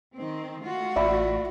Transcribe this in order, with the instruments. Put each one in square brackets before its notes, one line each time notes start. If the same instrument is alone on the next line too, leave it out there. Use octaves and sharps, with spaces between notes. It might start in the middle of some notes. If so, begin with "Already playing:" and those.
[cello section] D#3 C4
A3 F4 F#4
[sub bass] A1 [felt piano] D5 E5 B5